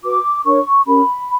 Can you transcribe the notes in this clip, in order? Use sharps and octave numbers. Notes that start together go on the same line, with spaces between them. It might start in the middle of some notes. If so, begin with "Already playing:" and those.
F#4 B4 D6
D4 A#4 C#5 C#6
C#4 G4 A#4 B5